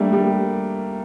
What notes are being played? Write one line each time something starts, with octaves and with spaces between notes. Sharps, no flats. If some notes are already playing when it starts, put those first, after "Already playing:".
Already playing: G3 A3 A#3 D4
G3